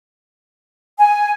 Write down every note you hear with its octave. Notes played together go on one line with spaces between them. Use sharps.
G#5